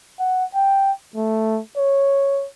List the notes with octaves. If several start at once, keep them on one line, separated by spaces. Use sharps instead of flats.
F#5
G5
A3
C#5